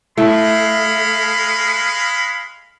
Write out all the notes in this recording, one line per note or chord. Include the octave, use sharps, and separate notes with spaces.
G#3 A3 E4 F5 B5